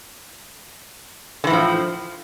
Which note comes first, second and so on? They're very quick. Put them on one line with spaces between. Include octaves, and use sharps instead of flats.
D3 E3 A2 F3